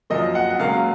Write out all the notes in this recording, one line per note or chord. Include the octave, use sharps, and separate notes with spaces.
F#2 F3 A#3 D#5
F#5
F#5
C#2 C#3 F#3 A#3 C#4 F5